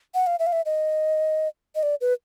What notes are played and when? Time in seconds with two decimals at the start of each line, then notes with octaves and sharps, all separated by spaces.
0.14 F#5
0.27 F5
0.39 E5
0.47 F5
0.52 E5
0.66 D#5
1.75 D#5
1.83 D5
2.01 B4